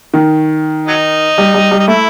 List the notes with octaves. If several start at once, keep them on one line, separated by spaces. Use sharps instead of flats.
D#3
F#3 D#4
G3
G3
G3
D#4
A3 E4